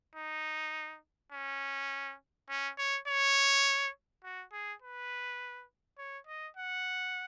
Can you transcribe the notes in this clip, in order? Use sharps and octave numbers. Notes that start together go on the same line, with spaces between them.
D#4
C#4
C#4
C#5
C#5
F#4
G#4
B4
C#5
D#5
F#5